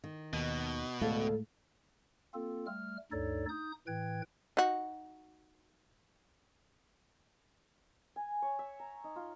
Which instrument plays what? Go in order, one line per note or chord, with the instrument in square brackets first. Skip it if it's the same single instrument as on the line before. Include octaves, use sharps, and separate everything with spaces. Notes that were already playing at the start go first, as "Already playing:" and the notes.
[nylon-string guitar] D#3
[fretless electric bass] D#2 [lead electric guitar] B2
[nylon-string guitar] D2 A4 F5 [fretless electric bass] A2 G#3 A3
[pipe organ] A#3 C4 F4 A4
G3 A3 F6
D2 G2 D#4 A4 C#5 D5
D#4 D#6 G6
A2 E3 B4 G5 G#6
[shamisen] D#4 F#4
[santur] G#5
C#5
E5
A#5
D#4
F4